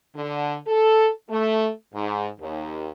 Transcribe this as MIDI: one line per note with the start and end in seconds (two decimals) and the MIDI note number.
0.16 0.57 50
0.68 1.10 69
1.30 1.69 57
1.94 2.27 44
2.40 2.90 39